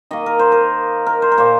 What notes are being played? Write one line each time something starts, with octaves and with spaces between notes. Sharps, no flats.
D#3 A#3 D#5
A#4
C5
A#4
A#4
C5
A#4
A#2 A#3 C5